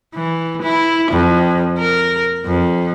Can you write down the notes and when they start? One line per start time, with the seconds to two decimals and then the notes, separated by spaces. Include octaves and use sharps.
0.15 E3
0.62 E4
1.12 F2
1.79 A#4
2.47 F2